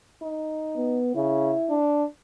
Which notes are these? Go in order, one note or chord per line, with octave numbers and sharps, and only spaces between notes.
D#4
B3
C#3 E4
D4